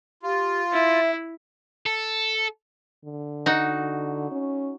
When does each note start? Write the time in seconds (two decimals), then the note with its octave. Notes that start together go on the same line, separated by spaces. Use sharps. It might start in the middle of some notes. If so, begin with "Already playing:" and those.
0.23 F4 G4
0.72 E4 E5
1.86 A4
3.05 D3
3.46 D#4 F#4
4.31 C#4